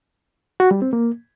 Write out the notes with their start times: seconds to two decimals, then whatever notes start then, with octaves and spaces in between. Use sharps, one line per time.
0.60 F#4
0.71 G3
0.82 C4
0.93 A#3